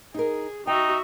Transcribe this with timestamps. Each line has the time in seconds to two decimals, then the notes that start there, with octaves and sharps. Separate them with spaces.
0.14 D#4 G#4 A#4
0.67 D#4 F#4 E5 G5